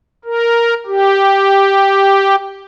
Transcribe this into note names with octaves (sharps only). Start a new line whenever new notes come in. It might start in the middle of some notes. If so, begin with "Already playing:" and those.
A#4
G4